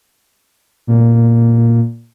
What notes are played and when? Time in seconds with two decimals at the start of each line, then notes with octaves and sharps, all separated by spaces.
0.87 A#2